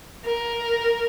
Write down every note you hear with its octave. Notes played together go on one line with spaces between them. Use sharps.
A#4